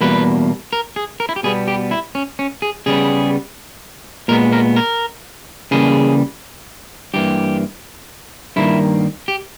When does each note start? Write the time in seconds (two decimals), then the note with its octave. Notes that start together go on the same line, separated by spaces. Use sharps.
0.01 E2 B2 G3 A#3 B4
0.73 A#4
0.96 G#4
1.20 A#4
1.29 E4
1.36 G4
1.43 B2 G3 B3 G#4
1.68 G4
1.91 E4
2.15 C#4
2.39 C#4
2.62 G#4
2.86 C#3 G3 B3 G#4
4.28 A#2 G#3 B3 A#4
4.53 A#4
4.76 A#4
5.71 C#3 E3 G3 A#3 G#4
7.14 G2 E3 A#3 G4
8.56 G2 D#3 G3 A#3 E4
9.28 G4